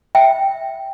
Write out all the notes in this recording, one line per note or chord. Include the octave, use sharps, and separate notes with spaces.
E5 G5